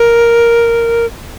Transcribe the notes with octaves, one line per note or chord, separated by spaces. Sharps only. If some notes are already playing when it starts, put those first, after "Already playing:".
Already playing: A#4